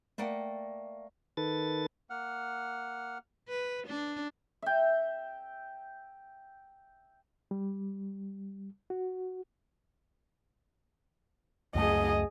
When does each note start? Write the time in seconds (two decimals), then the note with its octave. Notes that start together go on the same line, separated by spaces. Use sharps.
0.18 A3 A#3 D5 F#5 G5
1.37 D#3 A4 B4 A6
2.10 A#3 F#5 F6
3.49 B4
3.88 D4
4.62 E5 G5
7.51 G3
8.90 F#4
11.75 C#2 F#2 A3 G#4 D#5